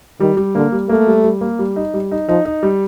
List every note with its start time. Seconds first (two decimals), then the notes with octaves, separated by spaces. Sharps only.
0.20 D#3 G3
0.37 G3
0.55 D3 A#3
0.72 G3
0.89 A3 A#3
1.07 G3
1.24 G3
1.41 A#3
1.59 G3
1.76 D#4
1.94 G3
2.11 D#4
2.28 F3 D#4
2.45 D#4
2.63 G3